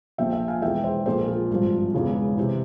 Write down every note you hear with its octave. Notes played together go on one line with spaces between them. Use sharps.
A#1 A#2 F3 E5 G5
E5 G5
F5 G#5
E1 E2 E3 E5 G5
C5 E5
A#1 A#2 F3 G#4 C5
A#4
F4 G#4
G#1 G2 F3
E1 E2 C#3 E3
C3 E3